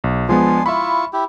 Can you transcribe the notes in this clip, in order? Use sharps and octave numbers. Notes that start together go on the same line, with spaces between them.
B1
F3 G#3 B3 D4 G#5 C6
E4 F4 E5 B5 C#6
E4 G4